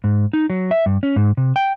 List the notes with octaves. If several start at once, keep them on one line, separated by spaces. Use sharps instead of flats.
G#2
D#4
F#3
E5
G2
C#4
G#2
C3
G5